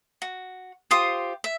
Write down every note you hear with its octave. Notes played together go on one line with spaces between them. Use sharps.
F#4
F4 G4 C5 D#6
E5